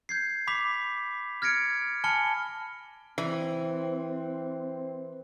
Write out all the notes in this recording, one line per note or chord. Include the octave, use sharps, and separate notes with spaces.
G6 G#6 C7
B5 D6 B6 F7
F6 G#6 A#6 C#7 D7
G#5 A5 B5 F6 C#7 G7
E3 C4